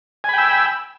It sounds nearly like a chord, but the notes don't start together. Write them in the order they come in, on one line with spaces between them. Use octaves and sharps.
G#5 B5 G5 E6